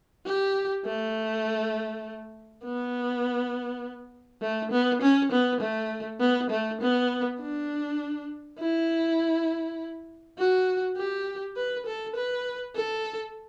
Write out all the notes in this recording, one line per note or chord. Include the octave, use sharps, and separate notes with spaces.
G4
A3
B3
A3
B3
C#4
B3
A3
B3
A3
B3
D4
E4
F#4
G4
B4
A4
B4
A4